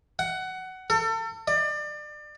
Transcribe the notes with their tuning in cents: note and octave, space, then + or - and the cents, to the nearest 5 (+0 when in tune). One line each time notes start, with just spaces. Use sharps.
F#5 +20
A4 +35
D5 +30